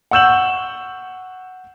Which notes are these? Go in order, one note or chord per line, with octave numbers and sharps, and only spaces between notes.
F#5 C#6 E6 G6 E7 F#7